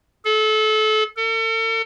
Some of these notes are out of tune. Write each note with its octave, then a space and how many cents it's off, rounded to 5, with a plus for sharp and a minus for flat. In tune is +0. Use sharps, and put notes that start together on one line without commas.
A4 -30
A4 +40